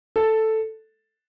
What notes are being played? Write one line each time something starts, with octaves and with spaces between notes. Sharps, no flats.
A4